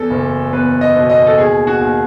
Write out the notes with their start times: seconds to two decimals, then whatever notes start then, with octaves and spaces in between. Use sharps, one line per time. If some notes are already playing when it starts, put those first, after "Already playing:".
Already playing: E2 A4
0.10 F#1
0.52 E2 B4
0.81 D#5
0.96 B2
1.10 D#5
1.27 A4
1.38 D#2 G#4
1.67 F#4
1.81 D#2